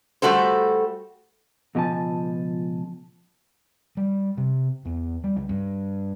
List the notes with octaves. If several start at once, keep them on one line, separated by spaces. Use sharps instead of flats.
G3 A3 F#4 A4 C5
C#2 B2 F3 G#5 A5
G3
C3
E2
G3
C#2
G2